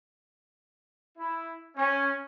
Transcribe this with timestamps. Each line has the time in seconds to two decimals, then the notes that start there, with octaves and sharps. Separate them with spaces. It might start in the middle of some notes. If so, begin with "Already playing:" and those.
1.17 E4
1.75 C#4